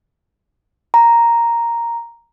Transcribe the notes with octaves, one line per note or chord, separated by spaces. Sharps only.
A#5